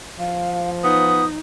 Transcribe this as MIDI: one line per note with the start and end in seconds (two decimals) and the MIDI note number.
0.19 1.35 53
0.19 0.70 77
0.84 1.23 59
0.84 1.39 63
0.84 1.26 87